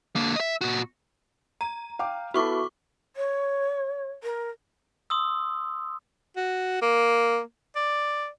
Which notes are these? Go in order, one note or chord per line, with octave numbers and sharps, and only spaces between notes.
D3 A#3
D#5 E5
A#2 F#4
A#5 D#7
F5 G5 D6
B3 E4 F#4 A4 C#6 D6
C#5
A#4
C6 D#6 E6
F#4
A#3
D5